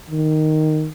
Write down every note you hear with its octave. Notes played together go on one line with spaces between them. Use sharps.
D#3